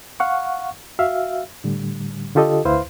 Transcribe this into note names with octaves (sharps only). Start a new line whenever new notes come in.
F5 F#5 C#6
F#4 E5 F5
A2 D3 G3
D3 F4 G4 A4 D#5
D2 E4 B4 C5 F5 C6